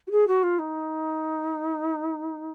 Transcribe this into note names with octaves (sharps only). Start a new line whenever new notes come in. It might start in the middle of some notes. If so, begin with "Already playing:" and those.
F#4
G#4
F#4
F4
D#4